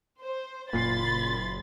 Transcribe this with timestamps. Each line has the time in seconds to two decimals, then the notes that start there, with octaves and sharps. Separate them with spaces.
0.20 C5
0.73 F#1 A#2 B5 C6 A6 C7